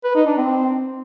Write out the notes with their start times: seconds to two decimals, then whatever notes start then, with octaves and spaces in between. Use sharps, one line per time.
0.04 B4
0.15 D#4
0.26 D4
0.37 C4